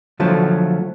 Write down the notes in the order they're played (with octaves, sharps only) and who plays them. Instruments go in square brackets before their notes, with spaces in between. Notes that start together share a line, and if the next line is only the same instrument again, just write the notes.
[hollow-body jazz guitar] D3 F3 F#3 A3